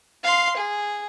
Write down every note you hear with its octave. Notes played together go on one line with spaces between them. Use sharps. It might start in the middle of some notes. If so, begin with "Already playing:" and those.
F5 C6
G#4